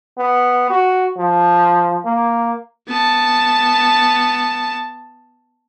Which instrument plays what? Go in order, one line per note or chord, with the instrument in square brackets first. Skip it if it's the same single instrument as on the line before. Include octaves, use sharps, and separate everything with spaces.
[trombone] B3
F#4
F3
A#3
[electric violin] B3 A5